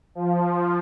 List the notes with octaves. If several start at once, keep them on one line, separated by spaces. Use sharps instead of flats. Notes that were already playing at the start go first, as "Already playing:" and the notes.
F3